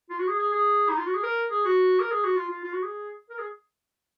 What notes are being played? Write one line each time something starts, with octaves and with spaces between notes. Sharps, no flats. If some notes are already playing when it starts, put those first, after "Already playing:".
F4
F#4
G#4
G#4
G#4
D#4
F4
F#4
G#4
A#4
G#4
F#4
A#4
G#4
F#4
F4
F4
F4
F#4
G#4
A#4
G#4